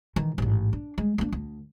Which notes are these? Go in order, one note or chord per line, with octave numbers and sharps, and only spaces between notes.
D#3 E3
A1 G#2
D4
G#3
A#3 D4
D2